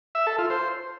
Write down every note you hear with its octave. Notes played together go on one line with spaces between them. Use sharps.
E5
A4
F4
C5